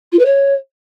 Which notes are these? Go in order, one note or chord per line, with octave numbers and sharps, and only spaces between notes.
F4
B4
C#5